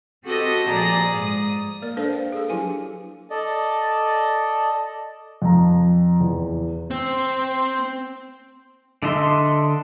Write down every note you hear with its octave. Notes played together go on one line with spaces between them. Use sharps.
C4 F#4 G4 A4 D#5
A#2 F3 G#4 D5 A#5 D#6
G#2 D#6
A#3 A#4 D5
D4 A4 B4 C5 F5
D5 F5 G5
G#4 A4
F#3 D4 E4 G4 B4 G#5
A4 D5 D#5
F2 A#5
E2
C4
D3 D4 D#5 E5 C6